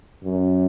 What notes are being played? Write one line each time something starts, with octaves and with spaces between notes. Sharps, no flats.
F#2